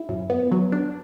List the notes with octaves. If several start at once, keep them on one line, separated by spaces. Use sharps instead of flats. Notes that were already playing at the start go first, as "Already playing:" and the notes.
Already playing: E4
F#2
B3
F#3
D4